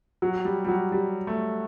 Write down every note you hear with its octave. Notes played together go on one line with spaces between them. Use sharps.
F#3
G3
G3
F#3
G3
A3